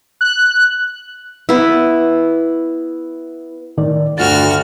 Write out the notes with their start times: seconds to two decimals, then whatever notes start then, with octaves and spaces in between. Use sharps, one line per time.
0.21 F#6
1.49 B3 E4
3.77 A2 D#3 D5
4.18 D2 G2 F4 F#4 F6 A6